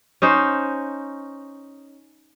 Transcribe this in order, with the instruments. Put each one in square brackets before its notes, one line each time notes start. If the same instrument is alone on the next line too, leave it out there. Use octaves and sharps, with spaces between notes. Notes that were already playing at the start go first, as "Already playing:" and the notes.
[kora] C#4 D#4 C5